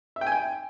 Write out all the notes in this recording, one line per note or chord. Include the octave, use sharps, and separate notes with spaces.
E5
G5
G#5
G5